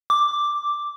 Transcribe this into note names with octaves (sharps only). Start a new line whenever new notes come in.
D6